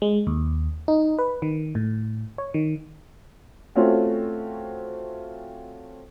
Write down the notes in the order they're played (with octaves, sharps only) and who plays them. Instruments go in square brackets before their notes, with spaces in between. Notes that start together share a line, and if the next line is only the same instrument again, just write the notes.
[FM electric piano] G#3
D#2
D#4
B4
D#3
A2
C#5
D#3
[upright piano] A3 C4 C#4 F4 F#4